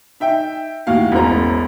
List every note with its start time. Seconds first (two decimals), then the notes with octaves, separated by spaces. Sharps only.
0.20 D#4 E5 G5
0.87 D#2 A2 F#4 F5
1.11 E1 A1 C#4 F#4 C5 A#5